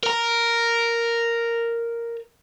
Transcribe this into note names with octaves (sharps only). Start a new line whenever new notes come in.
A#4 A#5